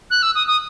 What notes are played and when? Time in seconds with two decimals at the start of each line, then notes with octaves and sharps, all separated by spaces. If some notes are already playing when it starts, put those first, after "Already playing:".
0.10 F#6
0.23 E6
0.35 D#6
0.47 D#6